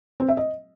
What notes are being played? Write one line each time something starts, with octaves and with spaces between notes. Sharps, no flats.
C4
E5
D#5